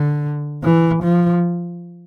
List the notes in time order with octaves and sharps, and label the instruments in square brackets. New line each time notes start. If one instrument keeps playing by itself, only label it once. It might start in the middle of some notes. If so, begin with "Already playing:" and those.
Already playing: [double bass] D3
E3
F3